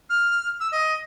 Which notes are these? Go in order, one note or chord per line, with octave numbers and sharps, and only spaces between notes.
F6
E6
D#5